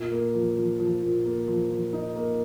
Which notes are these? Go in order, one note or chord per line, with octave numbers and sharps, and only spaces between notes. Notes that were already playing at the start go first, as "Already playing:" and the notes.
Already playing: A#2
A#3
F3
F3
F3
A#2
A#3
F3
F3
D#4
A#3